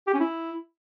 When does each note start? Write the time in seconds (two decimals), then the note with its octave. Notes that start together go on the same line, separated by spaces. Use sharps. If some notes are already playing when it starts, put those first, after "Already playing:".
0.07 G4
0.14 C#4
0.20 E4